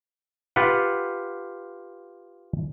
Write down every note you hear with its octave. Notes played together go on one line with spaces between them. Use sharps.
F4 G4 B4 F#5